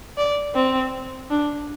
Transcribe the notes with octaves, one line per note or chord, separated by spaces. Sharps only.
D5
C4
D4